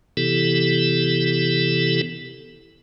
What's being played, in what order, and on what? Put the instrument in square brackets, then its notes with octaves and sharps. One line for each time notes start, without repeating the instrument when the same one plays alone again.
[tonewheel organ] C3 E3 B3 E4 G4 A4